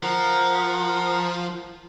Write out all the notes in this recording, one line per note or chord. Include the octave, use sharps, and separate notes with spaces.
F3 A#4 F#5